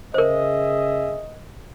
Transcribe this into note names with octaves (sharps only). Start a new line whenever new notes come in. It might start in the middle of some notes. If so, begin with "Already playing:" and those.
C#3 G#4 A#4 C5 D#5 E5